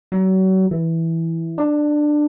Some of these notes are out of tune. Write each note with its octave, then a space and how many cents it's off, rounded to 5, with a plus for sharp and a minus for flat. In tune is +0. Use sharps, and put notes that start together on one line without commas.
F#3 +35
E3 -5
D4 +15